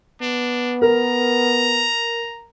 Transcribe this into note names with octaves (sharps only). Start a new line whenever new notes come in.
B3 D4
A#4 A#5